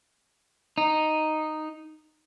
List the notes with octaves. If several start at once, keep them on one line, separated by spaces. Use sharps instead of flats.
D#4